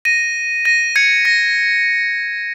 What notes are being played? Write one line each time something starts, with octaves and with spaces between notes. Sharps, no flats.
A#6 D#7
A#6 D#7
G#6 C#7
A#6